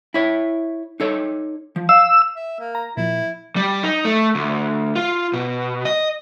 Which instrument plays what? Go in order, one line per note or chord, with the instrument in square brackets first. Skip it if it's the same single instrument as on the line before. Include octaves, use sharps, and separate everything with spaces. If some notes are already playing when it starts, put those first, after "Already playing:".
[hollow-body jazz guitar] E4 C#5
D#4 A4 C#5
F3
[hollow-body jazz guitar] F5 [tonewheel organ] E6
[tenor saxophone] E5
A#3
[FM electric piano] A#5
[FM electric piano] A#2 F3 [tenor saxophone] E4
[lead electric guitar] G3
D#4
A3
D2
F4
B2
D#5